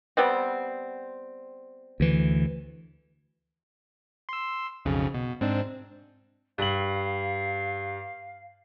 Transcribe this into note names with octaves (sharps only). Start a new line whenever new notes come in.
G3 B3 C4
D2 E3
C6 E6
B1 F2 C#3
B2
G#2 C4 D4
G2 F5 F#7